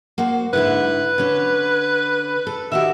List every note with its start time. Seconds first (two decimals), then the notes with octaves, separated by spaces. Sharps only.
0.18 A#3 F#4 C5
0.53 G#2 D3 E4 B4
1.18 D3 C#4
2.47 A4
2.72 D#3 F#4 G4 E5